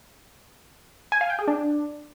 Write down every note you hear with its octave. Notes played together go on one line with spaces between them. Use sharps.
G#5
F5
G5
G#4
D4